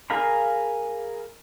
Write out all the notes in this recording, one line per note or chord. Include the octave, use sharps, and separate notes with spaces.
G#4 A#4 F5 A#5 B5